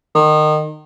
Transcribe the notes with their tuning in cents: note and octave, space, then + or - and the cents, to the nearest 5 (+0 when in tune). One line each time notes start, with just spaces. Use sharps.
D#3 -25